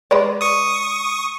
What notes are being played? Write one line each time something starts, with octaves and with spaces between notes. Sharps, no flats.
G#3 B4 D5
C#6 D#6